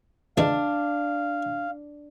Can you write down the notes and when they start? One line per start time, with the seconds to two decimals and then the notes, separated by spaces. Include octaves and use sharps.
0.37 C#2 E3 G#3 D4 F5